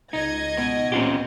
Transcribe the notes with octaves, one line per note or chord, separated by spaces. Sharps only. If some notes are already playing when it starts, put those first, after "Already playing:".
C#2 D#4 D#5 G#6
B2
A#2 C4 C#4 F4 G4